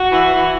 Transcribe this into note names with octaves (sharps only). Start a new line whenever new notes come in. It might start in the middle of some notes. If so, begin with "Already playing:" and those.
Already playing: F#4
E3
E3